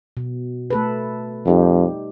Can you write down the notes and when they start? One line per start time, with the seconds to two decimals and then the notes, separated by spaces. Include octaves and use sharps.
0.17 B2
0.70 A3 A4 B4
1.46 F2 G3 D#4 G4